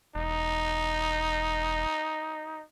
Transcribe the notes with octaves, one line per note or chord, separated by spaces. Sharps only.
E1 D#4